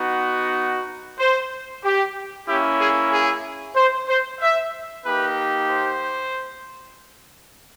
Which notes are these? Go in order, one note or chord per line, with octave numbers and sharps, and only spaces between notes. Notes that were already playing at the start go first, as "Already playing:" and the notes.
Already playing: B3 D#4 F#4
C5
G4
A#3 C#4 E4 G4
G#4
G#4
C5
C5
E5
A#3 D#4 G4 B4
C5